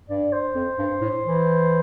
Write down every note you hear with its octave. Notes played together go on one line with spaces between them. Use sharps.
G2 D5
C5
F2
G2
A2
E3